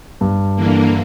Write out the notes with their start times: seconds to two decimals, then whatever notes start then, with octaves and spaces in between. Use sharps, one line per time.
0.21 G2
0.56 D3 E3 A#3